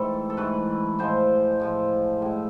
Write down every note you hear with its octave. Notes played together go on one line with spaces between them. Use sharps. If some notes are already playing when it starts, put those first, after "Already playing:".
Already playing: G#2 E3 A3 C4 A4
A4
G#2 E3 A3 B4
A2 F3 G#3 C5
A2 F3 G#3
A2 G#3